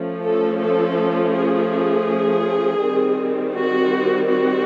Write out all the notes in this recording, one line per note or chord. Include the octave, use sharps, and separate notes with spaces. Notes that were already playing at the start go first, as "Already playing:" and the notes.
Already playing: F3 A3 C#4
A4
A4
G#4
D#3 G3 C4
F#4
F#4